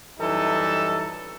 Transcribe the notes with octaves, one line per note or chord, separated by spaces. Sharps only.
F#2 E3 G3 D#4 E4 A4